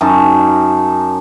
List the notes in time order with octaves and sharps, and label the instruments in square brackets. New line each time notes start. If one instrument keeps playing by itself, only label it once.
[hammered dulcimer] F#2 D#4 A5